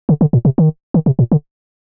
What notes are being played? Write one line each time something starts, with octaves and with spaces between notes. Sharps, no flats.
D3
D3
A#2
C3
D#3
D#3
C3
A#2
D3